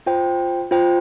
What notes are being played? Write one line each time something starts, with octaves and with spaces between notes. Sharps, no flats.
F4 C5 G5
F4 C5 G5